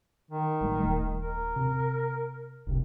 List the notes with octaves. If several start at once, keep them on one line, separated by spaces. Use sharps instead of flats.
D#3
A1 G3 A3
D#1 A3
A#4
C3
F1 C2 C3